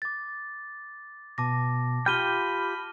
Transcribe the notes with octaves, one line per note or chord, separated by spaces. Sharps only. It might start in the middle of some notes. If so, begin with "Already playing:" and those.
D6 A6
B2 A5 D6 A#6
F4 G4 G5 B5 F6 D#7 G7